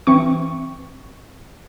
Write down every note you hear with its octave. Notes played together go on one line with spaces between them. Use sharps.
E3 C4 C#6